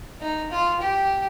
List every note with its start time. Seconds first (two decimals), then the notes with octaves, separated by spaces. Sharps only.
0.21 D#4
0.51 F4
0.81 G4